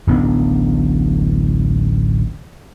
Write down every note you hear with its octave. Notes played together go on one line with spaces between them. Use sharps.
D1 A1 B3 D4